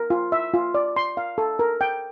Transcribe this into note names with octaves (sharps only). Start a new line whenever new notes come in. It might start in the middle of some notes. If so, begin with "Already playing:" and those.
Already playing: A#4
F4
E5
F4
D5
C6
F5
A4
A#4
G5